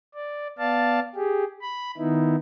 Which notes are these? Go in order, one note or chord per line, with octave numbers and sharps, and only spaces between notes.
D5
B3 D5 F5 A5
G4 G#4
B5
D#3 B3 D#4 E4